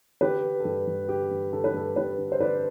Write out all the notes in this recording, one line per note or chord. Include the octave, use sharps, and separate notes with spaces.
D3 G4 B4
D3
A4
G2 G4
G2
D3 G4
G2
D3 A4
B4
G2 A4
G2 G4 B4
D3
C5
D3 B4 D5